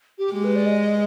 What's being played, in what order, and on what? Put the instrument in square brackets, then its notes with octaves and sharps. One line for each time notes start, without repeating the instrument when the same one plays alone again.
[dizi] G4
[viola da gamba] G#3 [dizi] G4
[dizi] B4
D5
D#5